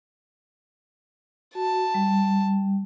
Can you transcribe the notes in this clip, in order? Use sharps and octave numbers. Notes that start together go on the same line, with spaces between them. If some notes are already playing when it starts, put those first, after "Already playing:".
F#4 A5
G3